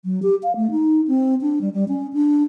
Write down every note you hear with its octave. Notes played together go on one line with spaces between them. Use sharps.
F#3
G4
F5
A3
D#4
C4
D4
G3
G3
C#4
D4